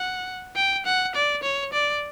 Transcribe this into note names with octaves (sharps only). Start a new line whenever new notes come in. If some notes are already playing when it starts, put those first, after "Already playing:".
Already playing: F#5
G5
F#5
D5
C#5
D5